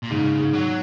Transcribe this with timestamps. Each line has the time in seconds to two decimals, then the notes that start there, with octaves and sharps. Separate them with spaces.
0.03 A#2
0.10 G#2 C#3
0.39 G#2
0.53 F#3